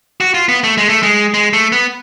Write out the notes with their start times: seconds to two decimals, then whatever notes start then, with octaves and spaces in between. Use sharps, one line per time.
0.21 F#4
0.34 F4
0.49 B3
0.64 A3
0.78 G#3
0.89 A3
1.03 G#3
1.34 G#3
1.53 A3
1.72 B3